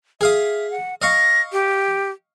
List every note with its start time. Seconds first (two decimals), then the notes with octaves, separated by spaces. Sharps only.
0.21 G#4 E5 F5 D#6
0.71 F#5
1.02 D#5 F5 C#6 A#6
1.52 G4